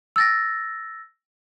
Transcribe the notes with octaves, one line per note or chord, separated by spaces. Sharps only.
E6 A6 A#6